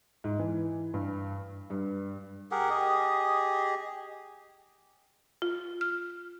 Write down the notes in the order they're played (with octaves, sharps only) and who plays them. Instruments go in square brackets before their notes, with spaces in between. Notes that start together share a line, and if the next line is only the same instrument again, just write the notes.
[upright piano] G#2
E3
G2
[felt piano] G2
[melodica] G4 G#4 A#4 F#5
G4 G#4 D#5
[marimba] F4
F6